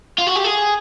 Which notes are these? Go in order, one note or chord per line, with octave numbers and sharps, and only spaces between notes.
F4
F#4
G4
G#4